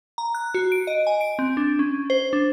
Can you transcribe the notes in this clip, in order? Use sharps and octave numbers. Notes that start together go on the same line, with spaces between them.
A#5
F#6
F#4
D7
D#5
G#5
D7
C4
D4
C#4
C5
D4